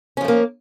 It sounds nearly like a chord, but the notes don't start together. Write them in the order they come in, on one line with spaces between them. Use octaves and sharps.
C#4 F3 A3 A#3